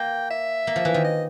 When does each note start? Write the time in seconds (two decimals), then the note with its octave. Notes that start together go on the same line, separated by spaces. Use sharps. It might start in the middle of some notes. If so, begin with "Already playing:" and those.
Already playing: A#3 G5
0.31 E5
0.67 A#3
0.76 F3
0.85 E3
0.94 D#3
1.04 D#5